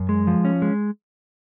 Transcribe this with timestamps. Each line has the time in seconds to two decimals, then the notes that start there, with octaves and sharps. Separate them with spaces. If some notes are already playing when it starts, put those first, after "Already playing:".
Already playing: F#2
0.09 G#3
0.27 F3
0.45 C#4
0.62 G#3